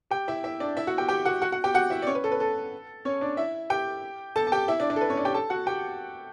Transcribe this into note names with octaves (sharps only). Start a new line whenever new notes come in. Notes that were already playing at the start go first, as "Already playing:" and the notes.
G4 G5
E4 E5
E4 E5
D4 D5
E4 E5
F#4 F#5
G4 G5
G4 G5
F#4 F#5
F#4 F#5
F#4 F#5
G4 G5
F#4 F#5
E4 E5
D5
C#4 C#5
B4
A4
B4
A4
C#4 C#5
D4 D5
E4 E5
G4 G5
A4 A5
A5
G4 G5
E4 E5
D4 D5
D4 D5
A4
B4
C#4 C#5
D4 D5
G4 G5
A4 A5
F#4 F#5
G4 G5